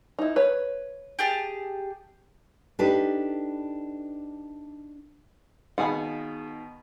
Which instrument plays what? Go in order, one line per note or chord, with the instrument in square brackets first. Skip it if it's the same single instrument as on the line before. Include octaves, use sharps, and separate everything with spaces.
[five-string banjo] D#4 E4
B4 C#5
[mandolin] G4 G#4 A5
[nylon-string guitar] D4 D#4 G4 A4 B4
[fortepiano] B2 D#3 B5 [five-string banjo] G#4 F5 F#5